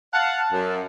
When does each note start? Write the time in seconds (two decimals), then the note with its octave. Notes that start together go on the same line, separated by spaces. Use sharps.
0.13 F5 F#5 A5
0.52 F#2